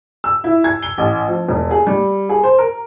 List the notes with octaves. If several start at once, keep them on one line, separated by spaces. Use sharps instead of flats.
E6
E4
G#6
G7
A1
F3
E1
G#4
G3
G#4
C5
A#4